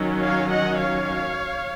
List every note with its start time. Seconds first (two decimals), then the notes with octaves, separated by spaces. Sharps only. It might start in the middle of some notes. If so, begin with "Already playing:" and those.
Already playing: D#3 F#3 C#4
0.22 C#5 F5
0.50 D#5 F#5
0.79 C#5 F5